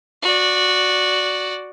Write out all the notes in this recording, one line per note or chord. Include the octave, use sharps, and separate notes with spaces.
F#4 D5